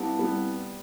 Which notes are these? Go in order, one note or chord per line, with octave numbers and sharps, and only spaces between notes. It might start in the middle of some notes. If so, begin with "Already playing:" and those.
Already playing: G3 B3 C4 E4 B4 F#5 A5
G3 B3